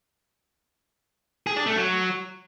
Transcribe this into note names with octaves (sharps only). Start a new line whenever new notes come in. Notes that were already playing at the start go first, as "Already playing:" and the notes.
G#4
D4
A3
F#3